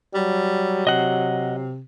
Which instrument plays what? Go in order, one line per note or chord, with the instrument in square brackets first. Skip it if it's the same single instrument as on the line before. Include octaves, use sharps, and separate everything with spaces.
[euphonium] F#3 [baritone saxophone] G3
[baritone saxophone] C3 [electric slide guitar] D#5 F#5